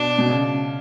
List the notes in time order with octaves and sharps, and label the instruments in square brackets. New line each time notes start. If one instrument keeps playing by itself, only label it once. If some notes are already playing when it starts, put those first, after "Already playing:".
Already playing: [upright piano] B2 [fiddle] D4
[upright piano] B2
C#3